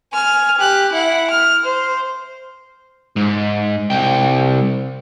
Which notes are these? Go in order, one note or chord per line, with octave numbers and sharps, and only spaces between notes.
G#5 F6
G4 F#6
E4 F#5
F6
C5
G#2
C2 G5